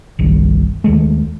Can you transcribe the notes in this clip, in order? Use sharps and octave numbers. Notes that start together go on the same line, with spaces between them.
G1 C2 D#3 G3
D#2 D#3 G#3 A3